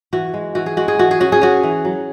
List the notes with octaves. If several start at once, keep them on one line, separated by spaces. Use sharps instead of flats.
E3 F#4
G#3
E3 F#4
G#4
G#3 F#4
G#4
E3 F#4
G#4
C#4 F#4
G#4
C#4 F#4
E3
F#3